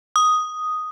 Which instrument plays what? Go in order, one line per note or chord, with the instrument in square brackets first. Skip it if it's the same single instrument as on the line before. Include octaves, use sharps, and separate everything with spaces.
[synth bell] D#6